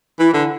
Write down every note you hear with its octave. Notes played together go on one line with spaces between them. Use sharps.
E3 E4
D3